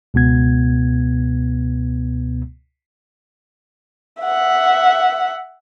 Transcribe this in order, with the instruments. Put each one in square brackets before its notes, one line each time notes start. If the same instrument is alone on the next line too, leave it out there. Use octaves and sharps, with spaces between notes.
[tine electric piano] C#2 B2 B3 G#6
[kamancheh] E5 F#5